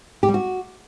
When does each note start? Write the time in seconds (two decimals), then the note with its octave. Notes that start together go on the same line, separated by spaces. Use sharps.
0.23 G4
0.28 G3
0.34 F#4